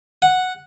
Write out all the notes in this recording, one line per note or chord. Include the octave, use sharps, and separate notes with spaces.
F#5